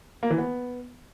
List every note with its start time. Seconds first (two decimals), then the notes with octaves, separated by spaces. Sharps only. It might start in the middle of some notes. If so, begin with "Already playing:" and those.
0.23 A#3
0.30 E3
0.38 B3